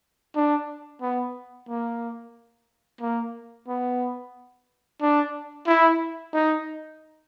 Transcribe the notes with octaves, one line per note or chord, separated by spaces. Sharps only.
D4
B3
A#3
A#3
B3
D4
E4
D#4